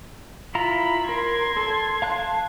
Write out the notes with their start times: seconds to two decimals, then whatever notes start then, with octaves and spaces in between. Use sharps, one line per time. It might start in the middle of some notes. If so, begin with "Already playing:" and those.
0.55 E4 F4 A#5 B5
1.09 A#4 C6 G#6
1.57 A4
2.02 F5 A5 F#6